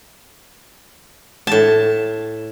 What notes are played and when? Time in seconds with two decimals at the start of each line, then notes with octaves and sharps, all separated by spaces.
1.47 A2 A5